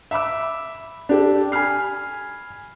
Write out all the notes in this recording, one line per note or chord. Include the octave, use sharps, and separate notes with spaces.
E5 B5 D6 E6
D4 G4 A4
G#5 B5 F6 C7